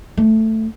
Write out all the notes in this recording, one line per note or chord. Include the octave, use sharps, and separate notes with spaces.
A3